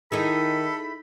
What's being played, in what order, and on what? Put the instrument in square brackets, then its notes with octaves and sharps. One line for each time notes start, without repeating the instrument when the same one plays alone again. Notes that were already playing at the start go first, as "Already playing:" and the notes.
[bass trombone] D#3 [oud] D#4 E4 G#4 [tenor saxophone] A4 [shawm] B5